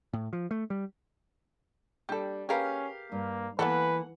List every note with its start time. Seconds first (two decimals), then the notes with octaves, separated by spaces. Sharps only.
0.13 A2
0.33 F3
0.51 A3
0.70 G3
2.09 G3 D4 G4 A4
2.49 C#4 G4 G#4 A#4 B4 F5
3.12 G2 A#3
3.59 E3 A#3 B3 A4 B4 F#5